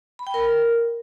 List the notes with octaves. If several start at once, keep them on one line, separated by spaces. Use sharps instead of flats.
B5
G5
A#4